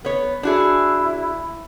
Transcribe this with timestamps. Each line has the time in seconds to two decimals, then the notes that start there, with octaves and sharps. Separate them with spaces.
0.05 B3 C#5
0.43 D4 E4 F#4 G#4